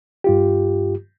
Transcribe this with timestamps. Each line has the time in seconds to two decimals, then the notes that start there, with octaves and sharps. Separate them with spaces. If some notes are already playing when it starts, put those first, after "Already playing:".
0.24 G2 F4 G4